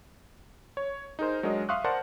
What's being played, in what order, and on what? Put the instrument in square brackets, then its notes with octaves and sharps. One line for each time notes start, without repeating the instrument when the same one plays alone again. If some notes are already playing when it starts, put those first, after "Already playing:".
[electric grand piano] C#5
D#4 G#4 A#4 C5
F#3 G#3 D4 A#4 D#5
E5 F5 C6 C#6 D#6 F#6
A#4 C5 D5 F#5 A5 C6